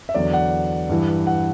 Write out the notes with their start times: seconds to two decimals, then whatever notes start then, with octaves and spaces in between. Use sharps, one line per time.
0.09 E5
0.15 E2 D3 F#3 D5
0.33 F#5
0.89 G2 E3
1.27 F#5